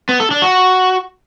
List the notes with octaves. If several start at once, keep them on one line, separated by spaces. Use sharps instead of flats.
B3
A4
D4
F#4